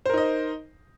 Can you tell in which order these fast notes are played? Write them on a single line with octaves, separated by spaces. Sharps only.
C5 A#4 D#4 D#5